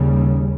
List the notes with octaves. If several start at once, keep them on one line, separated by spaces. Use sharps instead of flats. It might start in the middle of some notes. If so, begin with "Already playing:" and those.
Already playing: D#2 C#3 G3